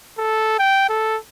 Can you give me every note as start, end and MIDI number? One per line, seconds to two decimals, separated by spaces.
0.18 0.55 69
0.59 0.88 79
0.89 1.18 69